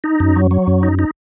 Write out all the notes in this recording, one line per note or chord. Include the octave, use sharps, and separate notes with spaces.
D#4
F#2
F#3
F#3
F#2
D#4
D#4